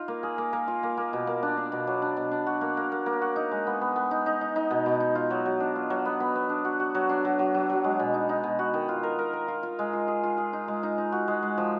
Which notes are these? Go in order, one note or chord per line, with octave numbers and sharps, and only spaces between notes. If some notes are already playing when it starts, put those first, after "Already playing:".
Already playing: D#4 F4
A#3
G#4
A#3
A#3
F4
A#3
A#3
B2
A#3
D4
D4
B2
F#3
D4
B2
D4
F#4
A#3
A#3
A#3
A#3
F#4
D#4
G#3
B3
B3
B3
D#4
D#4
D#4
D#4
B2
B2
D#4
F4
F#3
F#3
D4
F4
F#3
B3
B3
B3
D4
F#4
F#4
F#3
D4
F#3
F#3
F#3
F#3
G#3
B2
D#4
D#4
B2
F#4
D#3
F4
A#4
A#4
A#4
F4
F4
G#3
F4
G#4
F4
G#4
D#4
G#3
D#4
D#4
F#4
G#3
G#3
F3